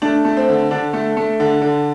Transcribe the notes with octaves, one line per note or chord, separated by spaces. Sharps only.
A3 D4
A3
C4
D3
D3 D4
A3
A3
D3
D3